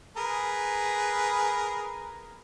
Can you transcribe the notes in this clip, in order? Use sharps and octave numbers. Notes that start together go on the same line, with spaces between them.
G#4 A#4 B4